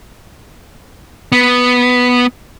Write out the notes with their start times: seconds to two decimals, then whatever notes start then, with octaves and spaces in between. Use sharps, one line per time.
1.32 B3